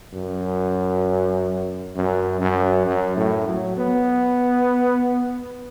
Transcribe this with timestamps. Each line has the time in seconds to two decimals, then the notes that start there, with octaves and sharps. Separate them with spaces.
0.13 F#2
1.95 F#2
2.41 F#2
2.87 F#2
3.17 A2
3.47 F#3
3.77 B3